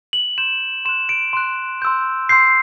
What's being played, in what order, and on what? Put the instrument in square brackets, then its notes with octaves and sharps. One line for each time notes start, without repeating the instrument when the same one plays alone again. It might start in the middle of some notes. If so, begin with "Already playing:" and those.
[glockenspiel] F#7
C6 G6 E7
C6 F#6 E7
D7
C6 F#6
C6 E6 G6
C6 E6 G6 C7